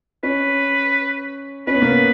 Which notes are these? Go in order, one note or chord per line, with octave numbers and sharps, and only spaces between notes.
C#4 B4
C#4 B4
B3
A#3
B3